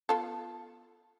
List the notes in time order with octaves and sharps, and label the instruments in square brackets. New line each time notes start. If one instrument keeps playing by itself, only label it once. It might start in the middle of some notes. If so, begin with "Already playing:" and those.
[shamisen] B3 F4 A4